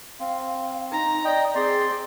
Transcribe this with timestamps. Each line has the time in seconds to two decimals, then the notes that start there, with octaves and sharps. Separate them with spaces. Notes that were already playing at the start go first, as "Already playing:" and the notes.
0.20 C4 F5
0.92 D#4 A#5
1.25 D5 D#5 G5
1.55 C4 G#4 D5 C6